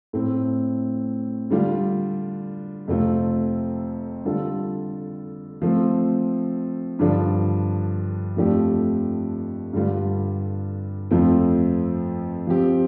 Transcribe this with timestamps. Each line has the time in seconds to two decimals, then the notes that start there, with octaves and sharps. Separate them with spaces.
0.13 A2 A3 C4
1.51 D3 G3 D4 F4
2.88 F2 C3 A3 C4 F4
4.25 D3 G3 F4 A4
5.62 F3 A3 C4
6.99 G2 D3 F3 D4
8.36 F2 F3 A3 D4 G4
9.73 G2 D3 G3 F4
11.11 F2 F3 A3 C4
12.47 F3 C4 G4